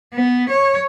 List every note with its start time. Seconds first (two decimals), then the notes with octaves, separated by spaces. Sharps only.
0.14 B3
0.50 C#5